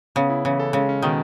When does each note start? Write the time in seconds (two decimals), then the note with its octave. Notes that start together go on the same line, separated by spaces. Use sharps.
0.16 C#3 B3
0.30 E4
0.45 C#3 E3
0.60 A4
0.73 C#3 G#3
0.89 C#4
1.02 B2 D#3